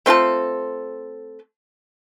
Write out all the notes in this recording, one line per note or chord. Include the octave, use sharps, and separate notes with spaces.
A3 C4 F4 A4